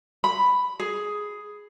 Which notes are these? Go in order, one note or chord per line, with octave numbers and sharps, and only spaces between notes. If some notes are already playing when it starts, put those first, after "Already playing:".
B5
G#4